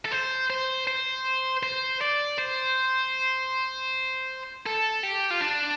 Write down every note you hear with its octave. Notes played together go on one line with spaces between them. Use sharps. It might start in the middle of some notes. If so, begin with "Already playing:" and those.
A4
C5
C5
C5
C5
D5
C5
A4
G4
F4
D4